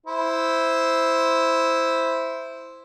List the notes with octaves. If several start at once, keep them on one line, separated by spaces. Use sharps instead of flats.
E4 C5